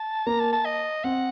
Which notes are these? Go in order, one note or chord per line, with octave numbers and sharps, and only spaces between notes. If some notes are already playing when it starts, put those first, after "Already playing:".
Already playing: A5
A#3 A#5
A5
A5
D#5
C4 F#5